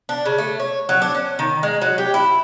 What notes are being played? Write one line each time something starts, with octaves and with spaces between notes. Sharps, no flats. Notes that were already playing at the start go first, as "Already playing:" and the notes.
D4
C#3
A3
C#5
F#3
D4
C#4
D#3
G#3
F#3
G4
E4